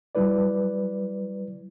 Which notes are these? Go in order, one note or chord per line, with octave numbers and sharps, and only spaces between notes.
F#3 G3 E4 B4 D5